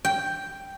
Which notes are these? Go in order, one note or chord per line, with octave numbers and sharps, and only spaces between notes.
G5